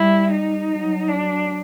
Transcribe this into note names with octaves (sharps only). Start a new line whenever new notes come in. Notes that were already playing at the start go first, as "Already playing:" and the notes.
Already playing: G3 E4
D#4
F#3
D4